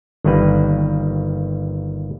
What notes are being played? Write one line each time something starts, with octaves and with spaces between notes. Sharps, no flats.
G1 D#3 G3 A#3 B4